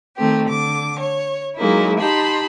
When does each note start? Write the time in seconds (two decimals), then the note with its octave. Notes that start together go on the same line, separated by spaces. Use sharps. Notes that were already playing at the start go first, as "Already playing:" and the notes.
0.17 D#3 A3 C4 G4
0.48 D3 D6
0.99 C#5
1.57 F#3 G#3 A#3 D#4 E4
1.99 D#4 G4 A5 B5 C6